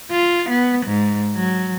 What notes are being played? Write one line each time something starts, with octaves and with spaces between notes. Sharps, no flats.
F4
B3
G#2
F#3